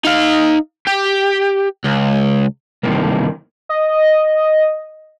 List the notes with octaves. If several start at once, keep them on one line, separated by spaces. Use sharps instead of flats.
D#4 F5
G4
C#2
G2 C3 D#3 E3 A#3
D#5